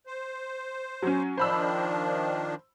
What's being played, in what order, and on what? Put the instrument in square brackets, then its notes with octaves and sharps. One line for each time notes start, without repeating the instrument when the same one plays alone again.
[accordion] C5
[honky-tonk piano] F#3 C#4
[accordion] D#3 F3 D4 [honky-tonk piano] C5 B5 E6